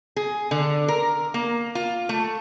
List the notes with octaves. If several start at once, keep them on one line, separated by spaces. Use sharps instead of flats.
G#4
D3
A#4
A#3
F4
A3